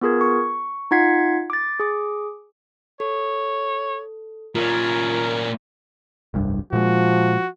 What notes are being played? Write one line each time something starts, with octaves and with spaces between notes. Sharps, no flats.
B3 F4 G#4 A#4 G#6
C#6
D#4 F4 F#5 G#6 B6 C7
D6 A6
G#4 D6
A4 C#5
A#2 C#4 F4 A#4
F1 C2 G2
A#2 F3 G#3 F#4